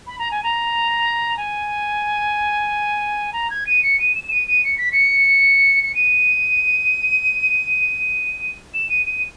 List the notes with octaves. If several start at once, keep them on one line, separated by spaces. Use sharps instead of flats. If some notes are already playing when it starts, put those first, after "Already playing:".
B5
A#5
G#5
A#5
G#5
A#5
G#6
D#7
C#7
D#7
E7
D#7
D#7
C#7
B6
C#7
C#7
D#7
E7
D#7
D#7